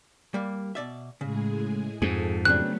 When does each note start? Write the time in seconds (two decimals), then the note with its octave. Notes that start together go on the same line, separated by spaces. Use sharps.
0.34 G3 A#3
0.75 B2 D5 E5
1.21 A2 C#3 G#3 G#4
2.02 F2 G#2 G#4 A4
2.45 C#3 F#3 A3 B3 C4 D4 F#6